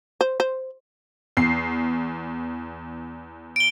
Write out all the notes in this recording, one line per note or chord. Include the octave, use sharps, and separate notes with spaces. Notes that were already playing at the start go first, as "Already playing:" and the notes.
C5
C5
E2 C7
D7 G7